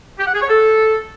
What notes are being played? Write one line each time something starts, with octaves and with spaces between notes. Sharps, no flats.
G4
F#5
G#4
C#5
A4